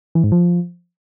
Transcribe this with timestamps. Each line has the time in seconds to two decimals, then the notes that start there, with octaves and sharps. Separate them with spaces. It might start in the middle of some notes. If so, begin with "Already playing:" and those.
0.15 E3
0.24 G#2
0.32 F3